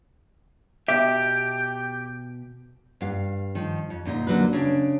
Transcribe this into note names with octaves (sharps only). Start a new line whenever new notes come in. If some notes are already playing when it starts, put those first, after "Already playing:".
B2 G4 E5 G5
G2 F5
D#3 F3
F2
D2 A#2 D#4
D3 F#3 A#3 B4
C#3 D4